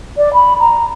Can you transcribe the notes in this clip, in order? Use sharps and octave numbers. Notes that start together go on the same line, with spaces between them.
D5
B5
A#5